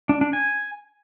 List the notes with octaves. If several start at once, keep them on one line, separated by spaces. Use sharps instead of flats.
D4
D4
G#5